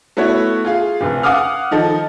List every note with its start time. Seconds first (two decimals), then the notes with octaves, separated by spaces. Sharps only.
0.17 A3 B3 E4 F#4 C#5
0.65 F4 G#4 F5
1.01 F1 D2
1.23 F5 F#5 G#5 D6 D#6 F6
1.71 D#3 F3 A4 D#5